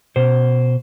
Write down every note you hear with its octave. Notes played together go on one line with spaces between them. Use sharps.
B2 C5